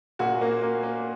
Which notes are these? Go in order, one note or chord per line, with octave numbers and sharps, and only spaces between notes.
A#2 F#4
A#3
A#3
A#3